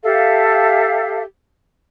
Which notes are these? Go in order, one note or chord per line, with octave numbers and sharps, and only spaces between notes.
G4 A4 E5 F5